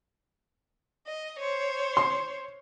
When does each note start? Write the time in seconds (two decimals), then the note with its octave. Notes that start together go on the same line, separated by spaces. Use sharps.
1.07 D#5
1.38 C5 C#5
1.97 C6